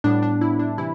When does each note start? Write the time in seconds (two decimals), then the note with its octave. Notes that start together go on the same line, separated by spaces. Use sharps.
0.04 A2 G3 B3 D4
0.23 D4
0.41 E4
0.59 D4
0.78 C3 E3 E4